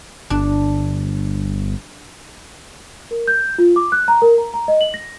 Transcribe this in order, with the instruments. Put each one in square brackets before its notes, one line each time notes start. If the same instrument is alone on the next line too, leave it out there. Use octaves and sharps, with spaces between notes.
[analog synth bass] G1 [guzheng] D4
[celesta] A#4
G6
F4
D6
F#6
A#5
A#4
A#5
A#5
D#5
F#7
A#6